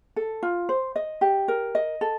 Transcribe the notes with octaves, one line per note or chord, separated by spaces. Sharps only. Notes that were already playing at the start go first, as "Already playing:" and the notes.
A4
F4
C5
D#5
G4
A#4
D#5
A4